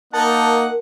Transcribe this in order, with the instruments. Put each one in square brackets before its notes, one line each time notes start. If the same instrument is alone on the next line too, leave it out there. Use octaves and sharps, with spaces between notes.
[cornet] A#3 [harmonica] D#4 F#5 [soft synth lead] A#4 [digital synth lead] A5